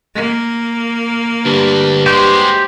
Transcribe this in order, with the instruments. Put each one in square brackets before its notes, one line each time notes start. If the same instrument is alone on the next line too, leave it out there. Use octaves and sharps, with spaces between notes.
[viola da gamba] A#3
[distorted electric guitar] D2 D3 [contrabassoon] G2
[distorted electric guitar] G#3 F#4 [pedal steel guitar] G4 C5